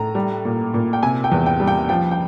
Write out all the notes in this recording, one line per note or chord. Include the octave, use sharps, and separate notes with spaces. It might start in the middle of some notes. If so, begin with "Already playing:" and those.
Already playing: A2 A#5
G3
A#2
A#2
G5
C3 G#5
G5
E2
G5
G3
G5
F3 G5
G5